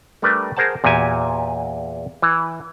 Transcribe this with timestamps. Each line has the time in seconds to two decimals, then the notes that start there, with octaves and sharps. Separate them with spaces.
0.22 G3 A3 D4 A#4 B4
0.57 G#4 A#4 C5 F#5 A5
0.84 E2 A#2 F#4 G4 G#5
2.22 E3